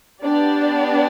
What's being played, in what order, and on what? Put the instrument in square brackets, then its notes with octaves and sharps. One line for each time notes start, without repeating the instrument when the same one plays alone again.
[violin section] B3 D4 G4 D5